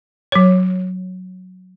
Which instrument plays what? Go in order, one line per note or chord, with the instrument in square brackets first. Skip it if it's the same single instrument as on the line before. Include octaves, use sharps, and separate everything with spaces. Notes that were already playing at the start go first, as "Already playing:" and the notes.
[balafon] F#3 C#5